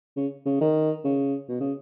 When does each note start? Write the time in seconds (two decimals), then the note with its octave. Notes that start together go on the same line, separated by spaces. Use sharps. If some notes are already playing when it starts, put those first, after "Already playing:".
0.17 C#3
0.46 C#3
0.60 D#3
1.05 C#3
1.49 B2
1.61 C#3